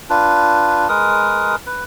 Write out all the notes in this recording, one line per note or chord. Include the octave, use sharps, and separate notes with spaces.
D4 F4 B4
G#3 A#4 B4 D#6
B4